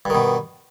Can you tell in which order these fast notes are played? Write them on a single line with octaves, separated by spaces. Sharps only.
G2 D#3 B2